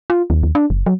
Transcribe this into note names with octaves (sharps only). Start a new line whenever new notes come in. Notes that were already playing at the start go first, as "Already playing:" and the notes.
F4
D#2
D#2
D4
F#1
F#3